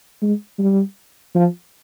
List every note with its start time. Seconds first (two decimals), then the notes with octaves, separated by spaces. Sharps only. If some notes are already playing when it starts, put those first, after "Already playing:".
0.21 G#3
0.59 G3
1.35 F3